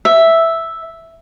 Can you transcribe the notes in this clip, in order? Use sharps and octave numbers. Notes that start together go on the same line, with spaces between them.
E5